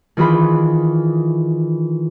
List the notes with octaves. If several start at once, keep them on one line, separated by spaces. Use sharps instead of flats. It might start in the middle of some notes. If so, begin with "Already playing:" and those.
D#3 E3 F4 G#4 B5